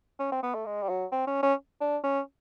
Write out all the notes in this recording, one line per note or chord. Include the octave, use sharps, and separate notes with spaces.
C#4
C4
B3
A3
G#3
G3
F#3
C4
C#4
C#4
D4
C#4